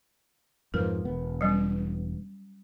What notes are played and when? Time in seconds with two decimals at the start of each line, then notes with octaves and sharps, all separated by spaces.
0.74 F2 G#2 F3 A#4 B4
1.05 E1 B3
1.41 F#3 G3 C#4